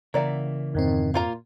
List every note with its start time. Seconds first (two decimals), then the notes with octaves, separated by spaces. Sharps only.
0.14 C#3 E3 A#3 D5 E5 F#5
0.75 F2 G#2 D#3 C4
1.14 A#2 A#3 F4 A#5